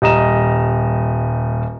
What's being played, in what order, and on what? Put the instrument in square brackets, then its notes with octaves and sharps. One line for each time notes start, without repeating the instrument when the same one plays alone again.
[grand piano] D#1 G3 D#5 A#5 E7